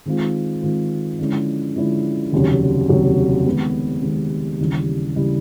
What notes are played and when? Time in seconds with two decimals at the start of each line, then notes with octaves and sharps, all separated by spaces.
0.06 D#3 G#3 C4 F4
0.62 D#3 G#3 C4 F4
1.19 D3 F3 G#3 C#4 E4
1.76 D3 F3 G#3 C#4 E4
2.32 F1 D#2 C#3 F#3
2.89 F1 D#2 C#3 F#3
3.46 D#3 G#3 B3
4.02 D#3 G#3 B3
4.59 D#2 C#3 E3 G3
5.16 C#3 E3 G3